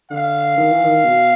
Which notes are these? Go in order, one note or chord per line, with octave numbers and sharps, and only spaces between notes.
D3 F5
D#3
E3
D#3
B2